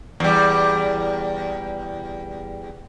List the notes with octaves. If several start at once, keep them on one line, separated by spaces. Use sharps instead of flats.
E2 G3